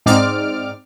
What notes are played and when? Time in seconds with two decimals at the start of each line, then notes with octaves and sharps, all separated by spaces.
0.06 G#2 C4 D#4 D5 D6 F6